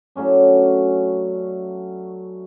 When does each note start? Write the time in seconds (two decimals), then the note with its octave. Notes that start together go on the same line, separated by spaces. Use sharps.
0.15 F#3 A3 C#4 D4